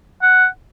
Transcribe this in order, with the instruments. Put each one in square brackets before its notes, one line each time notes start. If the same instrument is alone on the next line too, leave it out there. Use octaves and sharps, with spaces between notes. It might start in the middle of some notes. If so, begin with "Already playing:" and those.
[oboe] F#5